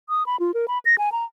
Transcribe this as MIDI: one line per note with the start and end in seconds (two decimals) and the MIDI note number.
0.09 0.26 87
0.26 0.37 83
0.40 0.52 65
0.54 0.66 70
0.68 0.79 83
0.85 0.96 94
0.98 1.12 80
1.12 1.24 82